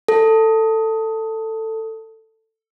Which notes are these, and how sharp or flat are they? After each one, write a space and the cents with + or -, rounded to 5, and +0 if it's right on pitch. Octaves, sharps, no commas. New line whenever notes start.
A4 +15